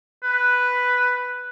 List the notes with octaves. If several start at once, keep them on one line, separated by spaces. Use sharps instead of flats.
B4